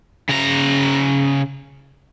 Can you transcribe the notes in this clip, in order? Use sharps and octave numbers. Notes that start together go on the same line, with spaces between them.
C#3 A#5